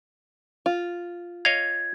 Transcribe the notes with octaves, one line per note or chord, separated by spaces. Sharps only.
F4
C#5 D#5 F5 G#6